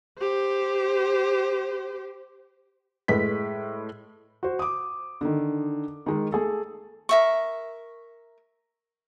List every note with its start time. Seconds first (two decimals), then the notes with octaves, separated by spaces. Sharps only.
0.19 G4 C5
3.08 A2 G#3 B4 B6
4.43 F#4 C5
4.59 D6 D#6
5.21 D3 D#3
6.06 D#3 G#3 A#4
6.32 A3 G#4 A4
7.09 A#4 E5 C#6